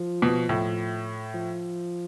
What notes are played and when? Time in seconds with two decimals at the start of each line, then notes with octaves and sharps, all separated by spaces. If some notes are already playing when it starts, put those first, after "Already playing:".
Already playing: F3
0.22 B2
0.49 A2
1.34 F3